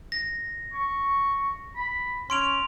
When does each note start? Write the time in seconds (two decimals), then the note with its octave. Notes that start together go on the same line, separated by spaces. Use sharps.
0.12 A#6
0.73 C#6
1.76 B5
2.30 C#4 C6 D7 F7